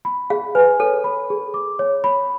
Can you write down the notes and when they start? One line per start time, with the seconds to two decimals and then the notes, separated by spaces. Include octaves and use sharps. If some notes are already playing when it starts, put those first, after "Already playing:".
0.05 B5
0.30 G#4 F5
0.55 B4 G#5
0.80 A4 C#5
1.04 B5
1.30 G#4
1.54 D6
1.79 C#5
2.04 B5